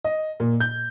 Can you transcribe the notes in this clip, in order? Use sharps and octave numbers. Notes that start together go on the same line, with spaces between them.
D#5
A#2
G6